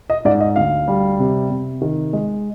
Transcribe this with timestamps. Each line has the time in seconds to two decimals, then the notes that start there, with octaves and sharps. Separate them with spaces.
0.10 D#5
0.25 G#2 D5
0.41 D#5
0.56 D2 F5
0.88 G3
1.19 C3
1.50 C3
1.82 D#3
2.13 G#3